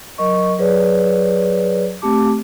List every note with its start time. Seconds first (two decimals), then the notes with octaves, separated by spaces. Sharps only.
0.18 F#3 A#4 D#5 C#6
0.58 F#3 G#4 B4 C#5 D5
2.02 A3 C4 G4 A5 D6